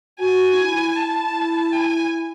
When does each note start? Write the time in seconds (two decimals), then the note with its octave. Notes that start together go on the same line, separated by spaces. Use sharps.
0.19 F#4 G#5
0.52 D#4
0.57 E4
0.96 E4 A5
1.72 G#5